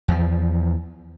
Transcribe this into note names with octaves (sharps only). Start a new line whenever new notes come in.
E2 F3